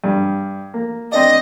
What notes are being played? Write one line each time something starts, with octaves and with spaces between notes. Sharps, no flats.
G2 G3
A#3
C4 D4 D5 D#5